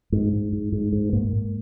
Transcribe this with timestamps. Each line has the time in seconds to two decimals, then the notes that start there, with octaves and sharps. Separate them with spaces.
0.12 G#2
0.33 G#2
0.53 G#2
0.72 G#2
0.93 G#2
1.13 G#2 A#3
1.33 G#2